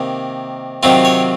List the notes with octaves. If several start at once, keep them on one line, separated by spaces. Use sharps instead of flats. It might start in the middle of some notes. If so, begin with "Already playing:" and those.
Already playing: C3 D#3 A#3
C3 D#3 F#3 C4 F4
C#5